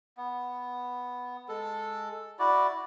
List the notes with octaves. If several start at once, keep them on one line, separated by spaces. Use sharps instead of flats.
B3
G#3 A4
E4 F#4 D5